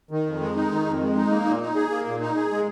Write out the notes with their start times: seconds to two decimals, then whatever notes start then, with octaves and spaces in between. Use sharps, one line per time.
0.11 D#3
0.26 F2
0.41 G#3
0.55 D#4
0.72 D#3
0.86 F2
1.01 G#3
1.15 D#4
1.31 A#3
1.46 A#2
1.61 D#4
1.76 G#4
1.91 A#3
2.06 A#2
2.21 D#4
2.36 G#4
2.51 G#3